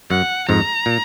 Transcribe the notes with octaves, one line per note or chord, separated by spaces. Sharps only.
F#2 F#5
F2 G#2 A#5
A#2